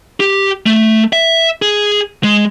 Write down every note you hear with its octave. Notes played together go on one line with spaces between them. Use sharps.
G4
A3
E5
G#4
G#3